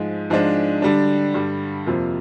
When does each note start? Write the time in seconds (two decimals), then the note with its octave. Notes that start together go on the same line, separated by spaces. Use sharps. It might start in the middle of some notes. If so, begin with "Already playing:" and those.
Already playing: G#2 F3 G#3
0.30 G#2 F3 G#3 D4
0.82 D3 G3 D4
1.34 G2 D3 G3
1.86 F2 C3 F3 A#3 F4